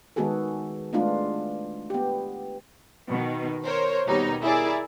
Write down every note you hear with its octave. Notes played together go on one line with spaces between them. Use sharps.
D#3 G#3 B3 F#4 G#4 A4
G#3 A3 B3 D4 F4
B3 G4
B2 D#3
A#4 C5 C#5
D#2 B2 G3 D#4 C#5
E4 G#4 A#4 D5